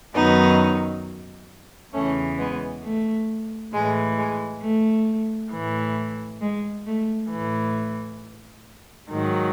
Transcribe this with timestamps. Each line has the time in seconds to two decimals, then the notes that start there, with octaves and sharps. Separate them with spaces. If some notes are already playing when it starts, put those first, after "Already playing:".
0.13 F#2 D#3 F#3 B3 D#4
1.93 E2 C#3 E3 A3 C#4
2.38 G#3 B3
2.83 A3
3.72 A2 E3 G#3
4.17 G#3
4.62 A3
5.52 A2 E3
6.40 G#3
6.86 A3
7.30 A2 E3
9.09 G#2 D#3 F#3